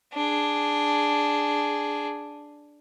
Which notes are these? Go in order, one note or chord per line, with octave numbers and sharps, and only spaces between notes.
D4 G#4